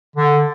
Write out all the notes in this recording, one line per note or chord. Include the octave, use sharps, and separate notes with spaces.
D3